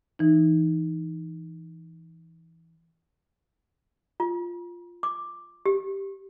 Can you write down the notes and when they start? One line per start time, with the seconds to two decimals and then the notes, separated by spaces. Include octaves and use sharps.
0.19 E3 D#4
4.20 F4
5.03 D6
5.66 G4